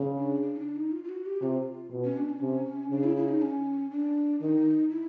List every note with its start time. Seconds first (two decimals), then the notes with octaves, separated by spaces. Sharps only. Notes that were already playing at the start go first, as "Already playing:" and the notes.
Already playing: C#3
0.17 D4
0.42 D4
0.54 D#4
0.59 D4
0.76 D#4
0.92 F4
1.04 F4
1.09 F#4
1.26 G4
1.42 C3 F4
1.91 B2
2.04 C#4
2.17 D4
2.30 C#4
2.41 C3
2.91 C#3 D4
3.04 E4
3.17 E4
3.28 D#4
3.42 C#4
3.91 D4
4.40 D#3 D#4
4.90 E4